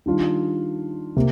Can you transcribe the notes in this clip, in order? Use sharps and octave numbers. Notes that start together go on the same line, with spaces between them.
D#3 G3 D4 F4
C3 A#3